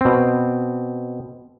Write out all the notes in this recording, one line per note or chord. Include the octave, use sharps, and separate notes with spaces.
B2 C4